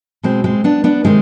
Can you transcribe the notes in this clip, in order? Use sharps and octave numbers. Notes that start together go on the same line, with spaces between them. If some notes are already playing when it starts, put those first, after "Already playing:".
B2 G#3 C4
G#3 C4
B3 D4
B3 D4
C3 D#3 G#3 C4